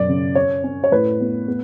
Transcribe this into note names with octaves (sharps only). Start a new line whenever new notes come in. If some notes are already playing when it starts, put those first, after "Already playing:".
Already playing: F#2 B2 D5
C#3
C#4 C#5
C#4
C#5
A2 B4
B3
B3